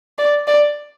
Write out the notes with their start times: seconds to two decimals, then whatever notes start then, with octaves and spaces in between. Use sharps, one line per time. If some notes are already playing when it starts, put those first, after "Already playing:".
0.18 D5
0.47 D5